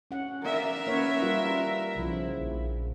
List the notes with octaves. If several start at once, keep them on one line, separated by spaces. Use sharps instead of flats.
C#4 F#5
A#4 D5 E5 F5
A#3 C#4 B4 C#5 F#5
G3 F4 F#5
B1 C#3 F3 E4
A#1